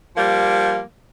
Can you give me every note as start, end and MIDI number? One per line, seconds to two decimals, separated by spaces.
0.15 0.80 53
0.15 0.80 55
0.15 0.80 58